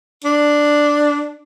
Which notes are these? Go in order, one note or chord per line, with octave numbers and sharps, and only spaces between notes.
D4